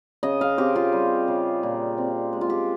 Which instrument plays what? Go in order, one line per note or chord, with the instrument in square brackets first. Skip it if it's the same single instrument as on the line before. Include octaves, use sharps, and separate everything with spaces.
[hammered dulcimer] C#3 D#5
F5
C4 G4
F4
G3
C#3
A#2
C4
G#3
F4
G4